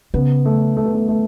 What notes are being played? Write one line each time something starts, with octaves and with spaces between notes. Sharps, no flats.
C#3 B3
A3
A3
B3
A3
A3